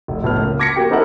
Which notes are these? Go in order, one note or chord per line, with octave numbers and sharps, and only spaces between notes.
F1
F1 A2 B3 F6
C#2 C#3 A#3
D6 G#6 A#6 B6 C#7
A#3 F#4 G4 G5
C4 D#4 E4 A4 A#4 F#5